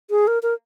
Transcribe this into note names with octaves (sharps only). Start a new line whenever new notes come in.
G#4
A#4
A#4